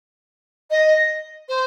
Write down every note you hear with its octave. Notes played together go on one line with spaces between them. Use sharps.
D#5
C5